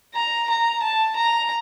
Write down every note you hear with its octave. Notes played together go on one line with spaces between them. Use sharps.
A#5
A#5
A5
A#5